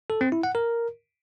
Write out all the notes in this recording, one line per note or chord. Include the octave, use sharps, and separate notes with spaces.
A4
C4
E4
F#5
A#4